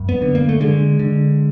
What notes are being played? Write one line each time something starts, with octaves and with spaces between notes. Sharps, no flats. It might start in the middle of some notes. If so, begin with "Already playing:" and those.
Already playing: F#2
B3
D3
A#3
A3
D3 G#3
D3